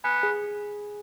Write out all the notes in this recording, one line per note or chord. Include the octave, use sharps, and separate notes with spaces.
B3 G#5
G#4